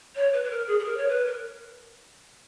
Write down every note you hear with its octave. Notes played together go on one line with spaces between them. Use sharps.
C#5
B4
B4
A#4
G#4
G#4
A#4
C#5
B4
A#4